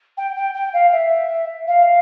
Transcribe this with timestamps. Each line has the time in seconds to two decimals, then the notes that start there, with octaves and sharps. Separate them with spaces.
0.18 G5
0.36 G5
0.54 G5
0.73 F5
0.92 E5
1.68 F5